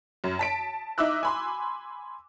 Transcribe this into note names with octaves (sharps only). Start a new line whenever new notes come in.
F#2
A5 B6 D7
D#4 E5 D6 E6 F#6
G#5 B5 C6